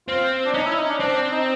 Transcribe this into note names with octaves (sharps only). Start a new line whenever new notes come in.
C4 F4
D4
C#4 D#4
E4
D#4
D4
C4 D4
D4
D#4